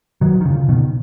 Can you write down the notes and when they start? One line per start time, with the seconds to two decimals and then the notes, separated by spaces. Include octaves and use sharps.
0.21 D#3 F#3
0.41 D#3
0.45 C#3 F3
0.69 B2 D#3